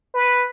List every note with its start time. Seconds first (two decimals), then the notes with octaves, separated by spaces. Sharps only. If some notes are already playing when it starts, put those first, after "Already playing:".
0.15 B4